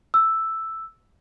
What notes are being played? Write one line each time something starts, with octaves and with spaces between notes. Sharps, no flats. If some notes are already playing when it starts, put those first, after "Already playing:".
E6